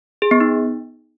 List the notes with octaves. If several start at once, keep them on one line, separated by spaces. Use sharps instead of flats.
G#4
B3
D#4